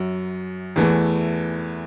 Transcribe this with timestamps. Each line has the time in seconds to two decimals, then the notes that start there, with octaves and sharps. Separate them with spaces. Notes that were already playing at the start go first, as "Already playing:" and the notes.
Already playing: F#2 F#3
0.76 E2 E3 A3